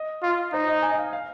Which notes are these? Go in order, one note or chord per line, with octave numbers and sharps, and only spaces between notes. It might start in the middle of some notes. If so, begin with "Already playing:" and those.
Already playing: D#5
F4
D#4 C5
D#5
G#5
D#5
F5
F5